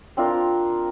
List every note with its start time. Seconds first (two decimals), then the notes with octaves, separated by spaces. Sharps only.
0.17 C4 D4 F4 A#4